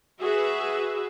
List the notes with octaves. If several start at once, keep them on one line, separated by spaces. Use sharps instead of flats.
F#4 G#4 B4 E5